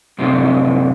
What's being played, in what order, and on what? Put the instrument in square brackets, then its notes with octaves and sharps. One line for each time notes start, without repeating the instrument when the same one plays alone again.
[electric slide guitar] F#2 A2 C3